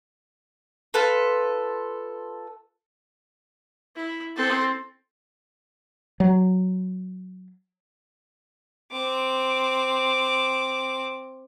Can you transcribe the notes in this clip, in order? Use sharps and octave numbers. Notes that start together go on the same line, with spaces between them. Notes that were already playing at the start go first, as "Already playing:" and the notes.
F4 A4 B4
E4
C4 A4
F#3
C4 D6